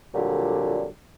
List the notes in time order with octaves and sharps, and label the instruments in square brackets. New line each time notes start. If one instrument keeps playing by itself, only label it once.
[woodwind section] F2 A#2 D3 F#3 G3